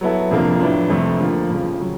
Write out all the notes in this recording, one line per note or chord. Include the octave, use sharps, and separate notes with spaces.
F#3 B3 E4 A4
F2 C3 F3 A#3 D4
A2 F#3 B3 D4
F2 C3 F3 A3
D3 F3 A#3
F2 C#3 F3
C#3 F#3